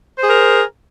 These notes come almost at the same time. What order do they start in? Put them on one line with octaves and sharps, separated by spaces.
C5 G#4 A#4